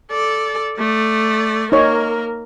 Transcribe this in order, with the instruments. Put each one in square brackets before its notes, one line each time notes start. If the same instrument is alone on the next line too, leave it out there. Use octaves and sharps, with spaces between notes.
[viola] A4 D5
A3 D5
[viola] A#3 A#4 [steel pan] D#4 C#5